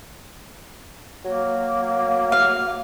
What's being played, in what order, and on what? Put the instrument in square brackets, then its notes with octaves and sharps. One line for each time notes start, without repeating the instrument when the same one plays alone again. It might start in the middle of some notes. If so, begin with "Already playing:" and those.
[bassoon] F#3 [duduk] A#3
[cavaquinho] F5